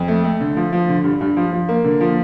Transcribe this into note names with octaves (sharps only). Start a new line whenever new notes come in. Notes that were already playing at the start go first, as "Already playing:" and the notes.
Already playing: F2
A3
A3
D3
F3
F3
D3
G2
G2
F3
F3
A#3
D3
F3